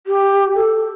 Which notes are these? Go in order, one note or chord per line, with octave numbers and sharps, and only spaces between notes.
G4
A4